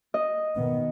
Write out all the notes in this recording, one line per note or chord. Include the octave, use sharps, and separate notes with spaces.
D#5
B2 D#3 B3